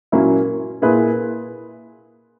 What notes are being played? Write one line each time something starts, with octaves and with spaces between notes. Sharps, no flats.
A#2 F#3 A#3 C#4 E4
A#2 A#3 E4 G#4 B4